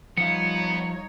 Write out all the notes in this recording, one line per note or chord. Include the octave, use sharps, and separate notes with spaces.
F3 G3 B3 D#4 C#5 F5 C#7